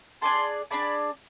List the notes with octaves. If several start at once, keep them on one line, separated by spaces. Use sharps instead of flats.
D4 G#4 D5 A5 C6
D4 G#4 D5 A5 B5